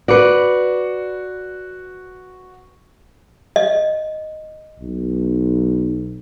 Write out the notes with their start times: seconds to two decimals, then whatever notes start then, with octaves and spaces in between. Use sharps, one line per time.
0.08 F#4 B4 D5 C#7
3.56 D#5
4.80 B1